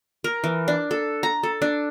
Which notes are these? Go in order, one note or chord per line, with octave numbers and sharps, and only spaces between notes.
A#4
E3
D4
A4
A#5
A4
D4